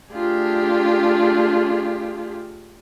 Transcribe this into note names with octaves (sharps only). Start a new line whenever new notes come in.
A3 D4 F4 G4 G#4